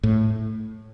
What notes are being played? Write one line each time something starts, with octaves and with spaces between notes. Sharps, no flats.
A2